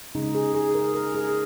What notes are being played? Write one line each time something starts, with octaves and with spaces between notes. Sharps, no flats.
C#3 G#3 D#4
G#4
G#4
A#4
A#4
G#4